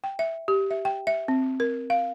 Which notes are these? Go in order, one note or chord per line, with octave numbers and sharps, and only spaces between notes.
G5
E5
G4
E5
G5
E5
C4
A#4
F5